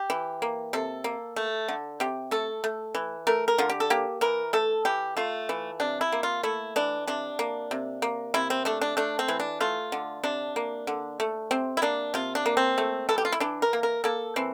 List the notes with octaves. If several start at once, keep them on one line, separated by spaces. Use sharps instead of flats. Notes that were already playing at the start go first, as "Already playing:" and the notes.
Already playing: G4
E3
A#3
C3 A4
A#3
A3
D3
C3 G4
A3 A4
A3
E3
A3 A#4
A#4
D3 F4
G4
A4
A#3 G4
E3 A#4
A3 A4
E3 G4
A3 F4
E3
C3 D4
E4
A#3
F4
A3 E4
E3 D4
C3 D4
A#3
C3
A#3
C3 E4
C4
A3 D4
D4
A3 D4
C4
E3
D4
A3 F4
D3
C3 D4
A#3
D3
A3
C3 C4
E4
A#3 D4
C3 F4
D4
A#3
C4
A3
E3 A4
G4
F4
E4
E3 D4
A#4
A#3
A#4
A#3 A4
E3 C4